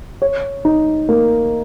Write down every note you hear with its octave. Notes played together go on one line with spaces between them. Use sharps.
C#5
D#4
A#3